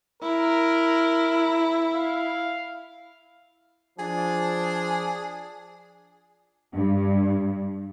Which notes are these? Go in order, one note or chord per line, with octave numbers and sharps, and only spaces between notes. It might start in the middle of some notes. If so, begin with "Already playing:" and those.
E4 A#4
F5
F3 D4 G#4
G2